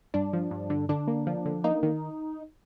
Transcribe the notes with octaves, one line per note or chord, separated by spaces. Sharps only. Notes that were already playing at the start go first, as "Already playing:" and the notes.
G2 D4
F3
G2
D3
D3 D4
A#3
F3
D3
A#3 D#4
D#3